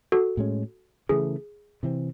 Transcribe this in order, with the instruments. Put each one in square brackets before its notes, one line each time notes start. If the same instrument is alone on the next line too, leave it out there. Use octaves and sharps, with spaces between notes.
[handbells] F#4 A4
[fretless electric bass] A2 G#3 C#4
[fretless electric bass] C#3 E3 A3 [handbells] G#4
[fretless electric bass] C3 E3 C4